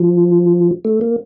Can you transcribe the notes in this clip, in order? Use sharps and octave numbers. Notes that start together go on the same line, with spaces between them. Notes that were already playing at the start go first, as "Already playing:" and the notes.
Already playing: F3
A3
A#3